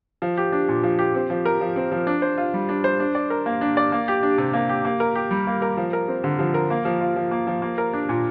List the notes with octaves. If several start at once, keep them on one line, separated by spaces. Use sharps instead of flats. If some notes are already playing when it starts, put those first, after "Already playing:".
F3
G4
D4
A#2
F3
G4
C4
F3
A#4
F3
C4
F3
D4
C5
F4
G3
D4
C5
D4
D5
A#4
A#3
D4
D5
A#3
G4
D4
C3
A#3
G4
A#3
A#4
G4
G3
A#3
A#4
F3
A#4
C4
D3
F3
A#4
A#3
F3
F4
F3
A#3
F3
A#3
A#4
D4
A#2